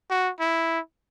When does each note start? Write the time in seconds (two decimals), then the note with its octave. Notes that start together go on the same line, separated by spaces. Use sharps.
0.10 F#4
0.40 E4